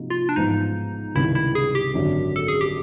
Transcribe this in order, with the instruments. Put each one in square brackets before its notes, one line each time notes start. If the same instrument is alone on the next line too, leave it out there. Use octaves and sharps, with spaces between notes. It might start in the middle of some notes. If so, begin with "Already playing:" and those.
Already playing: [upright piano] C3 F3 A#3 D#4 F#4
[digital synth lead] F4
D4
[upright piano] A1 G#2 F3 G#3 B3 [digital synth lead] D#4
[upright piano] C#2 C3 D#3 G3 [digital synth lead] E4
[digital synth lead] E4
G#4
G4
[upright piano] G#1 F#2 D3
[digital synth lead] A4
G#4
G4